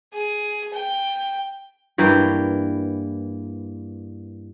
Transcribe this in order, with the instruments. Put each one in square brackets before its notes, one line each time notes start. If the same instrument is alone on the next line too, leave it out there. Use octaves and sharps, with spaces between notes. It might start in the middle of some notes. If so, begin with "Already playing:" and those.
[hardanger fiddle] G#4
G5
[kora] G2 E3 A#3 G5